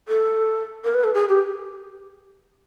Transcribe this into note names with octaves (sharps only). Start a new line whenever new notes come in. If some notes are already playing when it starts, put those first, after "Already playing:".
A4
A#4
B4
A4
G#4
G4